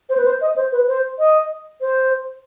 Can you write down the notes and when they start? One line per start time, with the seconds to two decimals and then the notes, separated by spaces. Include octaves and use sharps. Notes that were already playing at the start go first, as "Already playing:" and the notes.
0.09 C5
0.17 B4
0.25 C5
0.41 D#5
0.56 C5
0.72 B4
0.88 C5
1.19 D#5
1.81 C5